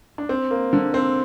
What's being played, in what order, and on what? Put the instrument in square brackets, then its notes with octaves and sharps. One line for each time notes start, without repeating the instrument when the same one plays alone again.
[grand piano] D4
C4
A#3
D3
C4